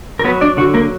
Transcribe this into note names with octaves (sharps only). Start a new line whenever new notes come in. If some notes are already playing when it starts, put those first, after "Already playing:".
A#4
F#3 B3 B4
D4 D5
D3 F#4
A#3 A#4